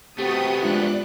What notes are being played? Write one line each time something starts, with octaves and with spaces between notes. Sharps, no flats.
C3 A3 B3 F#4 G4 G5 D#6
G#3 D4 F4 D5 F#6